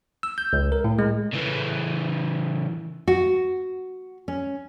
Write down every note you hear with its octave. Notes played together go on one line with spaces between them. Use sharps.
E6
G6
C#2
A#4
A2
G#3
C#3 E3
F#4
C#4